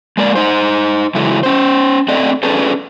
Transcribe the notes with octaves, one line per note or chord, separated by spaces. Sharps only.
G#3 A#3 D5
D#4 C5
C#3 E3 F#3 G#3 E4 A4
C#4 C5
A3 C4 A4 D5 D#5
C#4 D4 G#4 A4 B4